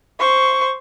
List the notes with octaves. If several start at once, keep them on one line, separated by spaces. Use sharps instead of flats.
C5 C#6